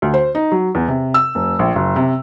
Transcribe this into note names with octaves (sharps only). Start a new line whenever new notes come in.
D2
C5
D#4
F#3
E2
C3
E6
F1
A#1
F#1
C3